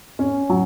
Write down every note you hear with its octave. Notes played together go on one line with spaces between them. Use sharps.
C#4
F#3